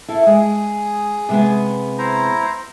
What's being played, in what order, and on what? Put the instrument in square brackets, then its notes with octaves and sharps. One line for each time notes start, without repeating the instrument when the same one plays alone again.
[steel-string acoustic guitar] E4 F5 [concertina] A4
[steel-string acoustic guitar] G#3 [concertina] G#4
[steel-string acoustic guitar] C3 G#3 B3
[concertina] E4 C5 A#5